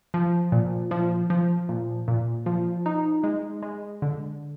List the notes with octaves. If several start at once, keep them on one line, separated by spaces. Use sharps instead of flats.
F3
A#2
F3
F3
A#2
A#2
F3
D#4
G#3
G#3
D3